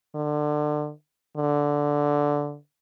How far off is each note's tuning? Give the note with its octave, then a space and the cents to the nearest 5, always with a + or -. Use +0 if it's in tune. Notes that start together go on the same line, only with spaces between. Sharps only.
D3 +25
D3 -10